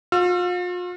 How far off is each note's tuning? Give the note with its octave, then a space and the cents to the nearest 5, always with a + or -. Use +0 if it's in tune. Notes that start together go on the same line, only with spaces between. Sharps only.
F4 +40 E6 +45